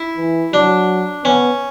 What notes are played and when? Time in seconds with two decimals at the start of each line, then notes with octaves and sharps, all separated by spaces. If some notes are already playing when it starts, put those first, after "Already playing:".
Already playing: E4
0.17 E3
0.53 F#3 D4
1.25 B3 C#4